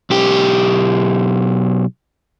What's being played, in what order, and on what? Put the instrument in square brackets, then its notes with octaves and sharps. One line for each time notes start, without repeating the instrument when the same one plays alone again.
[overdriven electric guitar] B1 G4